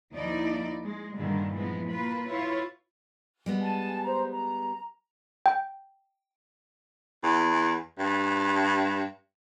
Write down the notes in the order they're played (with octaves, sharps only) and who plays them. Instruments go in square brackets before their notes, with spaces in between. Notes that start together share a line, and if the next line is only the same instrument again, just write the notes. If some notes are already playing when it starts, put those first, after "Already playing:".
[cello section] D#2 F3 A#3 D#4 E4 D5
G#3
G2 A#2 D3 D#3 G3 G#3
E3 F3 G#3 B3
A#3 F4 B4
E4 F4 B4 C#5
[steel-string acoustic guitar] G3 G#3 B3
[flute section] G#5 A5
C5 A#5
A#5
[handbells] G5
[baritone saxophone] E2
G2